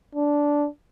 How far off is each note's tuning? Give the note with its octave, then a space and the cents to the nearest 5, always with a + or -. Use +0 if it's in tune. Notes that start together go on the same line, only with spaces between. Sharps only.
D4 -10